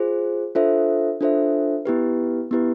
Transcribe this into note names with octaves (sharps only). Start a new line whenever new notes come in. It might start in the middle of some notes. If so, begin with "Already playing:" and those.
Already playing: F4 G#4 C5
D4 F4 A4 C5 E5
D4 F4 A4 C5 E5
B3 E4 G4 B4
B3 E4 G4 B4